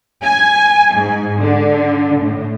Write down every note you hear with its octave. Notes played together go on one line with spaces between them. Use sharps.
G#5
G#2
D3
A2